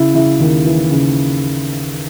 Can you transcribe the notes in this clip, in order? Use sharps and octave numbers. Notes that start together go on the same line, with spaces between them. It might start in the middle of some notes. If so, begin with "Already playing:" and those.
Already playing: C#3 E4
C#3 E4
D#2
E3
C#3